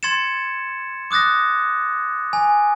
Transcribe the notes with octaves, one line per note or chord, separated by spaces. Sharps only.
C6 G#6 A6 C#7 E7
D6 D#6 F#6 A6 A#6
G#5